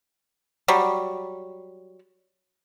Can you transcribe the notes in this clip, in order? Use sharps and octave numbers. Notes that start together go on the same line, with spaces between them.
F#3 G3